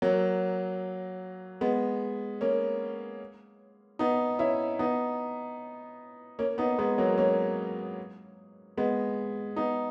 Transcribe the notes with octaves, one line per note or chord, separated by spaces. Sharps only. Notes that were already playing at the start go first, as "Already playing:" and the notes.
F#3 A#3
G#3 B3
A#3 C#4
B3 D#4
C#4 E4
B3 D#4
A#3 C#4
B3 D#4
G#3 B3
F#3 A#3
A#3 C#4
G#3 B3
B3 D#4